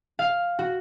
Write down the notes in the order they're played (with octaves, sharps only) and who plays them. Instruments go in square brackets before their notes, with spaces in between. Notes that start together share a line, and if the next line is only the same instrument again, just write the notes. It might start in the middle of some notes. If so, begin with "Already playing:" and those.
[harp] F5
F#4